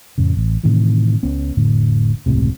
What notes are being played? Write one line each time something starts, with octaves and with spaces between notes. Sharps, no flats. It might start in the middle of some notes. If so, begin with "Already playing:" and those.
F2 A2 C#3
A1
A2 C3 D#3 E3
C#2 B3 C#4
F1 A2 D3
E1 C#2 A2 C3